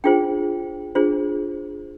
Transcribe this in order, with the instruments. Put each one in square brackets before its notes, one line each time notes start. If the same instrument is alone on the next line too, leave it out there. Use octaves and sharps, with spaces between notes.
[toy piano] D4 F4 G#4 C5 G5
D4 F4 G#4 C5